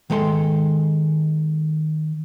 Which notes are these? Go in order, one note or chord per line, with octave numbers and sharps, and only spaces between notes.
D#3 G#3 A4 G5 C6